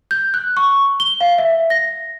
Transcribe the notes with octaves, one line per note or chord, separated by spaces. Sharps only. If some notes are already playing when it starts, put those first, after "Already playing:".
G6
F#6
C#6
G7
F5
E5
A#6